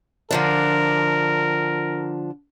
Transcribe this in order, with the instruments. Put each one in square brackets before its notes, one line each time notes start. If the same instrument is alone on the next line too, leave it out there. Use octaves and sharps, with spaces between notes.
[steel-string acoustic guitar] D3 F3 D4 [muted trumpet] A#4